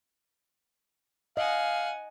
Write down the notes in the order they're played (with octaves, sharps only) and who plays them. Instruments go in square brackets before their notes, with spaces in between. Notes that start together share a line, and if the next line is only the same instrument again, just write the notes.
[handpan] D#5 [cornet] F5 [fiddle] F#5 G#5